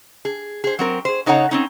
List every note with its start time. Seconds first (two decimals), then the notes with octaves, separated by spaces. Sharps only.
0.25 G#4
0.64 G#4 C5
0.79 F#3 C4 A#4
1.05 G#4 C5
1.26 C#3 D#4 A4 C#5 F#5 A#5
1.51 C4 C#4 D#4